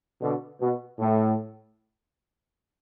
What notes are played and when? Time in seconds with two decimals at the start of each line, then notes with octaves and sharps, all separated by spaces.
0.21 B2 D3
0.60 B2
0.99 A2